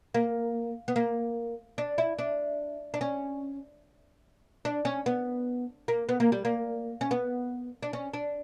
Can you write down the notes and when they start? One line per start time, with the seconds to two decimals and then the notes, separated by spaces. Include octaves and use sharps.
0.14 A#3
0.88 B3
0.96 A#3
1.78 D4
1.98 E4
2.19 D4
2.94 D4
3.01 C#4
4.65 D4
4.85 C#4
5.06 B3
5.88 A#3
6.09 B3
6.20 A#3
6.32 G3
6.45 A#3
7.01 C#4
7.11 B3
7.83 D4
7.93 C#4
8.14 D4